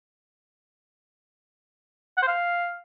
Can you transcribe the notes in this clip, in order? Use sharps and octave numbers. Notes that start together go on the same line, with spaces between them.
F#5
C5
F5